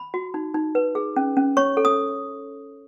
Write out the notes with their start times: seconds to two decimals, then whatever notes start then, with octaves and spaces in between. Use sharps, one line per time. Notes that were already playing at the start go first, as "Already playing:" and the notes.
Already playing: B5
0.14 F#4
0.34 D#4
0.54 D#4
0.75 B4
0.95 G#4
1.16 C#4
1.37 C#4
1.57 C#5 C#6
1.77 A4
1.85 D#6